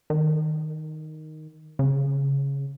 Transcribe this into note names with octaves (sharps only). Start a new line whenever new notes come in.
D#3
C#3